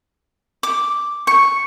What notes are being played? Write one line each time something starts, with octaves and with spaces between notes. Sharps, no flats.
D6
C#6